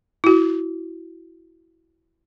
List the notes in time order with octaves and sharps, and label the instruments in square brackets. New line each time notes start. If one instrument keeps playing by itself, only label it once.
[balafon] E4 F#4